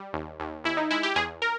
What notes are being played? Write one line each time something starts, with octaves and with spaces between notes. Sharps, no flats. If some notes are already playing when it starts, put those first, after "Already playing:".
Already playing: G3
D#2
D#2
D#2 E4
D#4
G#3 E4
G4
E2 G#4
A#4